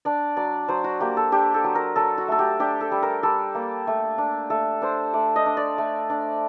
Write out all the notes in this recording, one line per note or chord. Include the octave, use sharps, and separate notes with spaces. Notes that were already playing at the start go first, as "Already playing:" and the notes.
D4 D5
F#3 D5
F#3 C5
F#4
A#3 G4
A4
D4 G4
A4
F#3
A#4
F#3 A4
F#4
A3 A4
G4
D4 G4
A4
G3
A#4
G3 A4
A#3
A3
D4
A3 A4
D4 C5
A3 D5
D#5
D4
D5
A3
D4